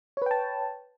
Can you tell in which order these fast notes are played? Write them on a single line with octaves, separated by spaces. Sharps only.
C#5 B4 G5 A5